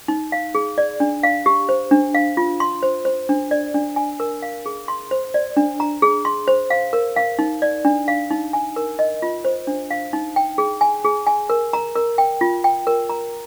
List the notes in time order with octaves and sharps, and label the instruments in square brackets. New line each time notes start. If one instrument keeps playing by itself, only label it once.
[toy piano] D#4
F5
G#4
D5
D4
F5
G4
C5
D4
F5
F4
C6
C5
C5
D4
D5
D4
G#5
A#4
F5
G#4
C6
C5
D5
D4
A#5
G#4
C6
C5
F5
A#4
F5
D#4
D5
D4
F5
D#4
G#5
A#4
D#5
F4
C5
D4
F5
D#4
G5
G#4
G#5
G#4
G#5
A#4
A#5
A#4
G5
F4
G5
A#4
A#5